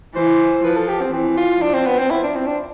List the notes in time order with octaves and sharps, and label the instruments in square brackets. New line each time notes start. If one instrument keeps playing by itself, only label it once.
[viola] E3 [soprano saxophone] C5
[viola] F3 [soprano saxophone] B4
[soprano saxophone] A4
G4
C4
[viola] E3 [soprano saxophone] C4
[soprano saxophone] F4
[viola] F3 [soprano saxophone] D4
[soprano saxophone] C4
B3
C4
E4
D4
C4
D4